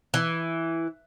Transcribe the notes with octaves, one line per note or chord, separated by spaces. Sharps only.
E3